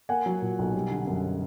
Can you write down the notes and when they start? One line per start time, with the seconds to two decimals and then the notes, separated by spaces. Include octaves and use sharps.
0.09 A#3 F#5 G#5
0.26 F#3
0.42 A#2
0.59 B1
0.75 G3
0.91 D3
1.07 F#2